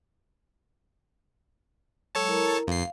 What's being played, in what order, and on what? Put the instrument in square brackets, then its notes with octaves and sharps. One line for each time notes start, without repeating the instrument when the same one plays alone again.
[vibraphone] F#3 G#3 [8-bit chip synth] A4 C#5 A5
[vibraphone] E4 A#4 A#5
[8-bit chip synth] F2 C7 [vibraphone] F5